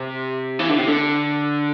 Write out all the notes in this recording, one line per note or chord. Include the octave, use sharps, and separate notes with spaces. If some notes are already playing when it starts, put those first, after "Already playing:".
Already playing: C3
E3
D3
C3
D3